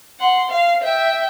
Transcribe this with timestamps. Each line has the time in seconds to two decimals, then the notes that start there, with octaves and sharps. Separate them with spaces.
0.20 F#5 C6
0.50 F5
0.83 E5 G5